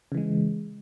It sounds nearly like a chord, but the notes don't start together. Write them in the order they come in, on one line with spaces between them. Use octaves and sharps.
C#3 E3 G#3